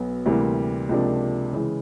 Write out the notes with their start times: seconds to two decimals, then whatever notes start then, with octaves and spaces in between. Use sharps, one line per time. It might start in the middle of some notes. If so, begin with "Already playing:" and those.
Already playing: B1 F#3 B3
0.26 D2 C3 E3 G3 A#3
0.89 C#2 C3 F3 A#3 D4
1.53 C#3 E3 G#3